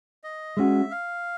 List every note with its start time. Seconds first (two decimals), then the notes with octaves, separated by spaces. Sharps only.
0.24 D#5
0.57 G#3 C#4 F#4 E5
0.91 F5